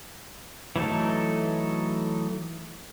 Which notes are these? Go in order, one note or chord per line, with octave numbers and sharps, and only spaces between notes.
E3 F#3 A3 D#4 A4